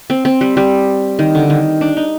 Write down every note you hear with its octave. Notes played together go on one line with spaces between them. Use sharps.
C4
C4
G3
G3
D#3
D3
D#3
D4
D#4